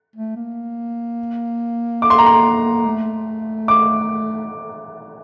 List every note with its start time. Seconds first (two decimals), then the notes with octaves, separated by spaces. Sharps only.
0.16 A3
0.36 A#3
2.02 D6
2.10 C6
2.18 A#5
2.26 C6
2.85 A3
3.68 D6